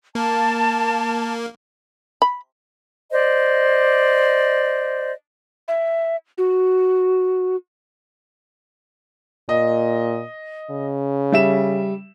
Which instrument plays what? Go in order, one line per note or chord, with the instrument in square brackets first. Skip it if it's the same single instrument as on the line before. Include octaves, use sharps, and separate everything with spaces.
[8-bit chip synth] A#3 [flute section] A5
[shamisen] B5
[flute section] C5 D5 D#5
[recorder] E5
F#4
[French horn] A#2 [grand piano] D#5
[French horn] C#3
[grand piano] G3 E5 E7